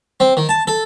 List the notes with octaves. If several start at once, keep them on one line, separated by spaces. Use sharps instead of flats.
C4
D#3
A5
A4